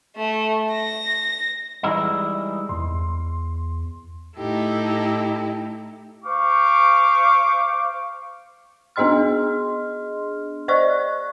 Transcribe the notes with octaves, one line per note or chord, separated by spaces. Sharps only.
A3
A#6
E3 G3 G#3 D#4 E4
E2 C6
A2 D#4 E4 G4 A4
C5 F5 C#6 D6
B3 D4 G#4 D#5 C6 F6
C5 D5 D#5 C#6 F#6